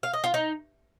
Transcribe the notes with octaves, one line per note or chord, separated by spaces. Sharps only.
F5
D#5
F4
D#4